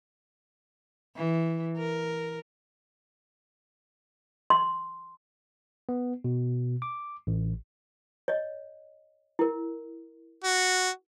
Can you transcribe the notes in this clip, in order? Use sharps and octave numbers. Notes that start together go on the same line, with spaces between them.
E3
A#4
C6
B3
B2
D6
A1
C#5 D#5
E4 A#4
F#4